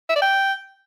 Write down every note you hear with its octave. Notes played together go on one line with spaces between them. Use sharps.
E5
D5
G5